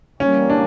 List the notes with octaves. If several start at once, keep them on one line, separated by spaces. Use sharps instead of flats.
E3 G3 A#3 C#4
D4